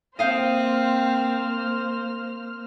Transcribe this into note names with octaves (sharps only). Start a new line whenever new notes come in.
A#3 C4 C5 D#5 F5 G5 F6